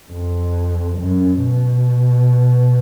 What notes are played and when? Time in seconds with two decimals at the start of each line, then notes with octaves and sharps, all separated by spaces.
0.11 F2
0.99 F#2
1.42 B2